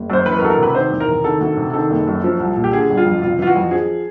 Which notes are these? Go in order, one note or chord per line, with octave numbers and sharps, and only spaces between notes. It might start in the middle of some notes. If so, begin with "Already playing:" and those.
Already playing: F#1
F#2 C5
E3 B4
A#4
D2 A4
A#4
C3 B4
D#3 C5
E2
A#4
C3
D#3 A4
D2
C3
D#3 A4
F#1
F#2
F3
C2
A#2
G4
D3 G#4
G1
F4
F2
C3 F4
E3 F4
F#4
F2
F3 G#4